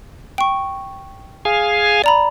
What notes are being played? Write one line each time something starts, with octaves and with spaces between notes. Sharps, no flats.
G5 C#6
G#4 F5 G#5
D5 A#5 B5